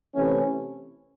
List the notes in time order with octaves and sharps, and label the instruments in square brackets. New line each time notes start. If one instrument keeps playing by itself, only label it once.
[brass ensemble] C3 E3 A3 C#4